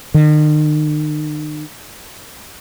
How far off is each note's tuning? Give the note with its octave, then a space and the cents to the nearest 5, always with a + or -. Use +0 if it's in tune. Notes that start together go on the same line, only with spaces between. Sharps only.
D#3 -40